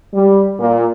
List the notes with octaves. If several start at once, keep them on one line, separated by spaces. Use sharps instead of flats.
G3
A#2